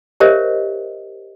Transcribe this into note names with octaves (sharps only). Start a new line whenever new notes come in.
G4 A#4 C5 C#5 D#5 E5